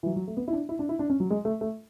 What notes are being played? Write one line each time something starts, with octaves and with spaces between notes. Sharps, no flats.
E3
F#3
F#3
A3
B3
E4
D4
E4
D4
E4
D4
C#4
F#3
G#3
A3
A3